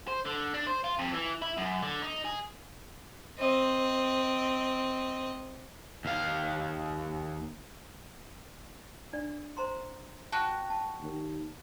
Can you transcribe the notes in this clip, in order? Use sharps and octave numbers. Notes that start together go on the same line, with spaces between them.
C5
D3
D4
C5
F4
F2
E3
E4
F#2
D3
D#4
G#4
C4 D#5
D#2 F5
D4 D5
C5 A#5 C6
F#4 G5 A5 F#6
A5
D#2